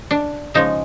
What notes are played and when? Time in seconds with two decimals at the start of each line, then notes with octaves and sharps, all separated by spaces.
0.11 D4
0.54 C#3 F3 G#3 D#4